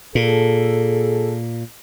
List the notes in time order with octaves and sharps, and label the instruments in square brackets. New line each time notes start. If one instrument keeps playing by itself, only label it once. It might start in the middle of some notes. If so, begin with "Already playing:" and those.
[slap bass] A#2 [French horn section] G#4 A4